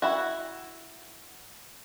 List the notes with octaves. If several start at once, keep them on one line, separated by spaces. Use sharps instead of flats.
E4 F#4